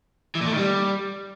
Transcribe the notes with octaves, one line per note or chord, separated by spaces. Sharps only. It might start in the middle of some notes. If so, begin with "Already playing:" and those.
E3
A#2
A3
D#3
G3